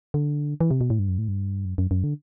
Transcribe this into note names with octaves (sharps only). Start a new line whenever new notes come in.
D3
E3
C3
B2
A2
G2
F#2
A2
G2
F#2
F#2
F#2
D3